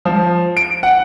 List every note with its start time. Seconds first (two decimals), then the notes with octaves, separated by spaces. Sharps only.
0.05 F3
0.57 D7
0.83 F#5